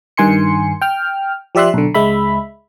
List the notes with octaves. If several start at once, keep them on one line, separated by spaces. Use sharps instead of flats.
G2 D#3 G#5 C6 C#7
G5 F6
F3 G4 D5 E5 C6 F#6
B1 D3
C#2 G#3 E5 B5